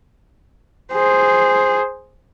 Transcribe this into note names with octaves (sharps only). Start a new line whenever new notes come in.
G#4 C5